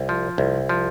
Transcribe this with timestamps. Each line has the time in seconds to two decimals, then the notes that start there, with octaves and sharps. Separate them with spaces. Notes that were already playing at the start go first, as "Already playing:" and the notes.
Already playing: C2
0.09 F3
0.38 C2
0.69 F3